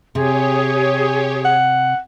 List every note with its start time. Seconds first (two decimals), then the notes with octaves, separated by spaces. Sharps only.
0.15 C3 G4 G#4 C#5
1.45 F#5